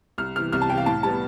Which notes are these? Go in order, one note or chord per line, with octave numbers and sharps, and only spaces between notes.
C2 F6
C3 E3 F6
C2 F6
A5
C3 E3 G5
F5
A2 A5
G3 B3 A5